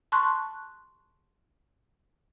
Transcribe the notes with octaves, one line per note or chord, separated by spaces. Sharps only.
A5 C6 C#6 F#6